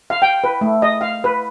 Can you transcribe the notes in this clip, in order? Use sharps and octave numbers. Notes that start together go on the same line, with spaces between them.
F5
G5
B4
A3
D#5
F5
B4